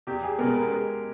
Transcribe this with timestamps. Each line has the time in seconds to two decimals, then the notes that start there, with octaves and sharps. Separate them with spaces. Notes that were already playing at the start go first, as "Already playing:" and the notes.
0.07 E2 G4
0.23 G#4
0.38 B2 G#3 B3 A#4
0.55 A#4
0.71 G#3